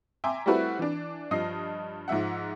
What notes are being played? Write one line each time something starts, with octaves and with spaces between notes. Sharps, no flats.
E5 G5 G#5 A#5 C6 D6
G3 A3 C4 E4 F#4 B4
E3 D4
G2 F3 D#5 D#6 C7
G#2 F3 E5 F#5